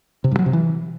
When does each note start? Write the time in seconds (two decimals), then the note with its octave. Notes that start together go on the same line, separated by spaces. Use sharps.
0.24 C3
0.31 G2
0.39 F#3
0.46 C3
0.53 E3